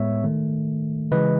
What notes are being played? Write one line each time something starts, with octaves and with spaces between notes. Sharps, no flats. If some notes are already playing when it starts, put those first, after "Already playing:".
Already playing: A2 G#3 B3 C#5 E5
D#3 A3
C#3 E3 G#3 B4 D#5